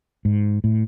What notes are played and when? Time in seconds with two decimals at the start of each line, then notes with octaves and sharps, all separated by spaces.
0.25 G#2
0.64 A2